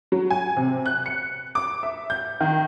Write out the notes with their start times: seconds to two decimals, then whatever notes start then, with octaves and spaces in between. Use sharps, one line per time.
0.12 F#3
0.30 G#5
0.57 C3
0.86 F#6
1.06 C#7
1.55 D6
1.83 E5
2.10 G6
2.40 D#3